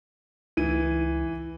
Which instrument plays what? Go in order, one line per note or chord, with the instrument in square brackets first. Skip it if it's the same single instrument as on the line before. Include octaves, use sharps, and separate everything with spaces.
[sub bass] C#2 [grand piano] E3 D#7